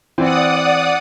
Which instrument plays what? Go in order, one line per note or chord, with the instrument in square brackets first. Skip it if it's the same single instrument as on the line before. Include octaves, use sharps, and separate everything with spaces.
[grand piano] E3 C4 [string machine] D5 F#5 D#6